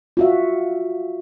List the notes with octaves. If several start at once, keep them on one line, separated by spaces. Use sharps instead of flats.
F4 F#4 E5